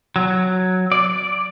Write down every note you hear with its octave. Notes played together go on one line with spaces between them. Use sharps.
F#3
D5